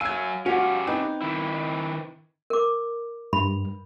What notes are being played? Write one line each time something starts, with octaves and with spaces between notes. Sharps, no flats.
F#3 F5 G#5 E6 G#6
C#4 F#4 G4 F5 F#5
C4 D#4 B4 G5
D#3 E4
A#4 D6
G2 B5